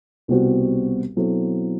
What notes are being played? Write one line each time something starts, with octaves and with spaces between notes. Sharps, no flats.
C2 B2 G3 C4 F#4
B2 F#3 C4 E4 A4